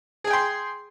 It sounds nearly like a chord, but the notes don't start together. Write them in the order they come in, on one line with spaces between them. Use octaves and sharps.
G#4 G#5 G5 C6